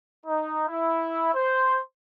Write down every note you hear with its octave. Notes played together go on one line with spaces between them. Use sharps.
D#4
E4
C5